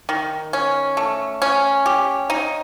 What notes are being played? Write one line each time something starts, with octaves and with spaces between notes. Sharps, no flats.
D#3
C#4
A3
C#4
G4
D#4